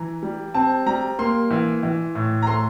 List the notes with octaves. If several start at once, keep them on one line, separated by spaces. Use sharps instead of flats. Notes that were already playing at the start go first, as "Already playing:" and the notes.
Already playing: E3 A#5
G3
C4 A5
G3 A#5
A#3 C6
E3
E3
A2
A#5
A3 C6